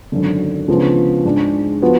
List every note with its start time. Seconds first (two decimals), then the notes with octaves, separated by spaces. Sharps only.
0.12 G#1 F#2 D3
0.68 C#2 C#3 F3 B3 D4
1.25 G#2 G#3 D4
1.82 F3 B3 F#4